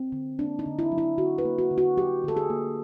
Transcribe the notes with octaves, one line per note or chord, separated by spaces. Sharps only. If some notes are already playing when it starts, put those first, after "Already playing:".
Already playing: C4
D3
A#3 D4
D#4
D3
E4
F#3
E4
D3 F#4
B4
A#3
F#4
D3
F#4
F#3 G4
D3 A4
G#4
A#3